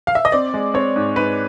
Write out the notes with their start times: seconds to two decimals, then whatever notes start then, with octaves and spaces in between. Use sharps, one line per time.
0.07 F5
0.15 E5
0.25 D#5
0.32 C4 D5
0.54 G#3
0.74 C4 C#5
0.96 G#2
1.16 G#2 B4